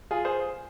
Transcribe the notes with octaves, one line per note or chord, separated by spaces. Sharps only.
F4 G#4
G#4 C5